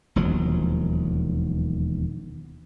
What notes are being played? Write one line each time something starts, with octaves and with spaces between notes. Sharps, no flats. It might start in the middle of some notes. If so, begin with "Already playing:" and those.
E1 D#2 F3 F#3